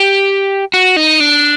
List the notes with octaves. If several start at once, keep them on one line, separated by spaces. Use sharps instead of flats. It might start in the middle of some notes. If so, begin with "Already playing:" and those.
Already playing: G4
F#4
D#4
D4